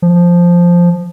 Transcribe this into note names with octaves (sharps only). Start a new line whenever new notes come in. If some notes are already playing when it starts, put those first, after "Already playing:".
F3